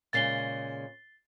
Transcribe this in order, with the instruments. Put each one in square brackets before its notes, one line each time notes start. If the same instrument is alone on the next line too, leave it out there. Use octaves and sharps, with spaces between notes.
[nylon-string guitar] A#2 C#3 G#3 [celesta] A6 C7 G7